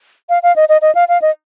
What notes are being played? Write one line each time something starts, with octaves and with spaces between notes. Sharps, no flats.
F5
F5
D#5
D#5
D#5
F5
F5
D#5